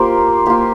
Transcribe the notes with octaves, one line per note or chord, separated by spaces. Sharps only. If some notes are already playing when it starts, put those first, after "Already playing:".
Already playing: A#3 F4 G4 A#4 C5
A#3 F4 G4